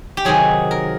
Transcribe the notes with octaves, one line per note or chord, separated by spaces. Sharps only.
G4
C3 D#3 F#3 G#4
A#4